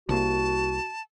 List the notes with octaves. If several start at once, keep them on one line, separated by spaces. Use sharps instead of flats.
C2 A#3 F#4 A5